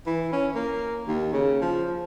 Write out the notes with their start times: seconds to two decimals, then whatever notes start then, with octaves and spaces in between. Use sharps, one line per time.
0.07 E3
0.32 C#4
0.55 A#3
1.07 D#2
1.33 C#3
1.62 F3